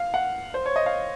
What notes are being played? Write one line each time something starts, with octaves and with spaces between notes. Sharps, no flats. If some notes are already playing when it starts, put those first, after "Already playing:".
Already playing: F5
F#5
C5
C#5
D#5
F5